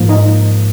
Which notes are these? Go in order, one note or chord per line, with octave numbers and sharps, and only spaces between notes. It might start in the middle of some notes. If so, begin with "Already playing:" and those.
Already playing: G#2 F3 A#3
D#4 D#5